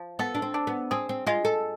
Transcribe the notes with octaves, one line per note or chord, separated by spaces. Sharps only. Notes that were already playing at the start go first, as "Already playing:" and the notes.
Already playing: F3
B3 A4
D4
C4
D4
B3
C4 G#4
C4
G#3 F4
A4